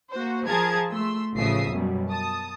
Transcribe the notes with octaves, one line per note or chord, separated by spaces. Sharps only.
A#3 F#4 C5
F3 G#4 A#4 A5 G#6
A3 C6 E6
A1 C#3 F3 E5 D#6 C7
F#2 B2 G3
A5 D#6